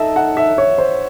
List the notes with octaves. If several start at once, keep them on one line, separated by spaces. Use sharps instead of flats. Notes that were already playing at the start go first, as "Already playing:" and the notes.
Already playing: D#4 A4 D#5 E5 A5
F#5
E5
C#5
C5